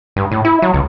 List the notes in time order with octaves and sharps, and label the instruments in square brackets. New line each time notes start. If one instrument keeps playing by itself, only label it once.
[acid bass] G2
A2
E4
F#3
C#2